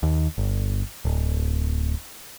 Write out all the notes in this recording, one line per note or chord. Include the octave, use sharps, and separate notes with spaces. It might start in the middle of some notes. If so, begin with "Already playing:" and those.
D#2
G1
D1